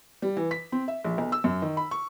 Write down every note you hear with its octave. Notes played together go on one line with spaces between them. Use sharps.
G3
E3
B6
C4
E5
A#1
B1
E6
F#2
D#3
B5
C#6